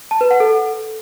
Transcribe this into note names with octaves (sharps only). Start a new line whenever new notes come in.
A5
B4
F#5
A4